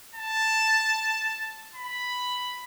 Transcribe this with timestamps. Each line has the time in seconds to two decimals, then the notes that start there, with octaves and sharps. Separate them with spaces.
0.15 A5
1.75 B5